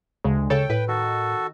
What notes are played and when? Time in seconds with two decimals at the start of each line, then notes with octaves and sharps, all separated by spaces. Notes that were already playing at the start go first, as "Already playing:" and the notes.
0.24 D2 C#3 G#3
0.50 C#3 A4 C#5 G5
0.70 A2 B4
0.88 D#3 F#4 A4